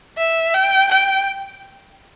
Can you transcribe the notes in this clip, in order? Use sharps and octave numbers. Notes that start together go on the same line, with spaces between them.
E5
G5
G5